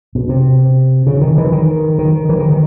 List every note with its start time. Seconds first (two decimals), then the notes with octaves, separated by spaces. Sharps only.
0.15 B2
0.29 C3
1.07 C#3
1.21 D#3
1.38 E3
1.52 D#3
1.98 D#3
2.29 E3
2.39 D#3
2.50 D#3